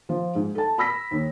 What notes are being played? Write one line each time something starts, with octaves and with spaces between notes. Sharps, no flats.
F3
G#2
A4 A5
B5 E6 A#6 B6
D#2